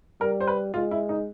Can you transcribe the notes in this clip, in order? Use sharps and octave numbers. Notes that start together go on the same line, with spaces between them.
G3 A#4
C5
B4
G#3 F4
E4
D#4